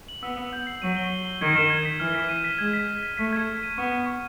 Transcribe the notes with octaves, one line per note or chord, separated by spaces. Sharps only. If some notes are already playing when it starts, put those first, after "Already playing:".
F#7
B3 E6
E6
G6
C7
F#3 D#7
G7
G7
G7
D#3 G#6
E7
G#6
B6
E3 F6
B6
D#7
B6
G#3 G#6
B6
G#6
B6
A3 B6
G#6
G#6
D#7
B3 C#6
B6
C#6